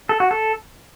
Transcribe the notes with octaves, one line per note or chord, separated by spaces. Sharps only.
A4
F#4
A4